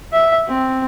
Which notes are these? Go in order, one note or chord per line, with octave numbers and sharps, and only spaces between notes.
E5
C4